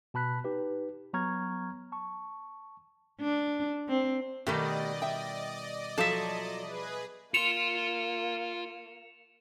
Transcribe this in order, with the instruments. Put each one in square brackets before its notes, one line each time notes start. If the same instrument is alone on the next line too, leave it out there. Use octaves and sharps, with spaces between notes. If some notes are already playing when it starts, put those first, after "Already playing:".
[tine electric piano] B2 A5 B5 F#6 B6
D#4 G4 B4
F#3 B3 A#5 C#6 F6 G#6
A5 C#6
[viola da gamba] D4
C4
[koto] B2 D#3 G3 [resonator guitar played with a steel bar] A3 G4 [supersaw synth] D5 D#5
[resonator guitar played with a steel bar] E5 G5
[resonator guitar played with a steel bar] F3 F#3 A4 [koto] E5 A5
[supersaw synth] G#4 B4
[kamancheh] A#3 [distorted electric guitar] F4 C6 [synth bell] C#7 E7 F7